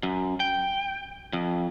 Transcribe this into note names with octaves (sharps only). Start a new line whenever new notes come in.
F#2
G5
F2